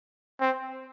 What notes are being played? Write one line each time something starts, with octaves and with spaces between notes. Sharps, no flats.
C4